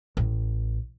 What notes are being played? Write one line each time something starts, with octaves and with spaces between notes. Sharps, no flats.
A1